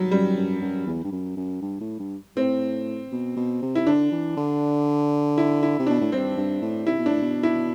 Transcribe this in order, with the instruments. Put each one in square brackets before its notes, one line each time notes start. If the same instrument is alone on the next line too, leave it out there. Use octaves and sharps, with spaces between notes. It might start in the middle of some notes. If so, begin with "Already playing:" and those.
Already playing: [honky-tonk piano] F#3 G3
[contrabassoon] F#2 [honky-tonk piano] G3
[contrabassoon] F#2
F#2
E2
G2
F#2
F#2
G2
A2
G2
[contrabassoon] A2 [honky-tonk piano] C4
[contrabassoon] B2
B2
C3
[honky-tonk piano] E4
[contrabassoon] D3 [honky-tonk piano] D4
[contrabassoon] E3
D3
[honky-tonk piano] E4
E4
[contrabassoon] C3
[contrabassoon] B2 [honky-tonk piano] D4
[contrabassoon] A2
[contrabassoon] G2 [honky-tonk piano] C4
[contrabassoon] G2
A2
[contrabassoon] C3 [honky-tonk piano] E4
[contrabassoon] B2
[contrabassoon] A2 [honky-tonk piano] D4
[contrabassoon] B2
[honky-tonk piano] E4